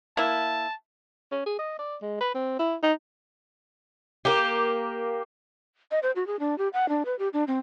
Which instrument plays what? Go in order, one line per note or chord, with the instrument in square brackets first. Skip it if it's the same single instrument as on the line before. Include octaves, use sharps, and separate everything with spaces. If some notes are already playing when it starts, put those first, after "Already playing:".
[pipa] A#3 E4 [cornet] A5
[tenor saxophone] C#4
G#4
D#5
D5
G#3
B4
C4
E4
D#4
[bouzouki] A#3 G4
[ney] D#5
C5
F#4
G#4
D4
G4
F#5
D4
B4
G4
D4
C4